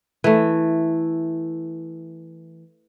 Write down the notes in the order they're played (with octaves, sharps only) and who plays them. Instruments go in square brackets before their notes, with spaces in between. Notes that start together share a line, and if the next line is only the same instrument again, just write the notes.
[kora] E3 A3